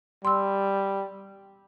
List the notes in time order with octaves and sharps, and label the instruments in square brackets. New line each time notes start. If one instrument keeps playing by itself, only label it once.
[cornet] G3 [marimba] C6 E6